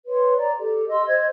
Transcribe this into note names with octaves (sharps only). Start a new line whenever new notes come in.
B4 C#5 C6
D5 A#5
G4 A4
D#5 C6 E6
C5 D#5 G#6